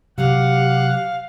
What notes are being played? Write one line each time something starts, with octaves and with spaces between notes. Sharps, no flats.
C3 F#3 G4 F5 F#5